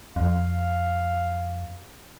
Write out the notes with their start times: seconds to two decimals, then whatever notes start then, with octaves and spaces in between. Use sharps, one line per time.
0.16 F2 F5